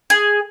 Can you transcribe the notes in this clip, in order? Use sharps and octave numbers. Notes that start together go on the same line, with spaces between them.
G#4